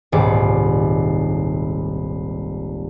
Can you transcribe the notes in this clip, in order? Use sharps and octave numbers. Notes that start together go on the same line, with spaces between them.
D#1 C2 G#2 D6